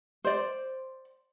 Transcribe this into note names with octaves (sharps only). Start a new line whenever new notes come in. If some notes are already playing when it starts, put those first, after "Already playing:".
C5 D5